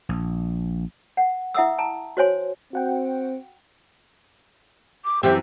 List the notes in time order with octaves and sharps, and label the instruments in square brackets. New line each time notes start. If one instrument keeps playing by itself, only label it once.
[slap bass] A#1
[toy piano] F#5
E4 E5 F#5 D#6 E6
A5 A#5
F#4 C5 C#5 G#5 C6
[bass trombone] C4 [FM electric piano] F#4 F#5 G5
[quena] D6
[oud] F#2 E3 C4 [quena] G4